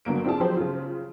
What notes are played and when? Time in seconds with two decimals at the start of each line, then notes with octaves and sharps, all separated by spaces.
0.05 G1 G2 F#3 A#3 D7
0.24 C4 D4 E4 F4 G#4 A5
0.40 F3 F#3 G4 G#4 C5
0.57 C#3 F4